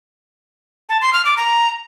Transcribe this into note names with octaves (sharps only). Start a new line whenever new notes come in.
A5
C6
F6
D6
A#5